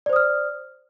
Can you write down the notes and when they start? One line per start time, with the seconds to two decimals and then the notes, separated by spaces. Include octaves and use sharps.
0.06 D5
0.09 C5
0.13 D#6
0.16 F6